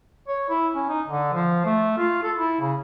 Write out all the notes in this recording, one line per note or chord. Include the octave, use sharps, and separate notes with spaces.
C#5
E4
C#4
D#4
D3
F3
A3
F4
A4
E4
C#3